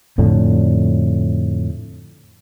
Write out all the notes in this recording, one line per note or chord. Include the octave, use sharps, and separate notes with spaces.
F2 A2 D3